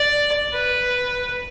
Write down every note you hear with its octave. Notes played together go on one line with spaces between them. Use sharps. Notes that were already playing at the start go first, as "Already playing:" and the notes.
Already playing: D5
B4